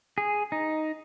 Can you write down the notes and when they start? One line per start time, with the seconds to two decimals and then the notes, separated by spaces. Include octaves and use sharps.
0.18 G#4
0.52 D#4